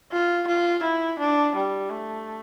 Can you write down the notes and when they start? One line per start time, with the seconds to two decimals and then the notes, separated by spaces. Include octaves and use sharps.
0.12 F4
0.47 F4
0.83 E4
1.19 D4
1.55 G3
1.90 A3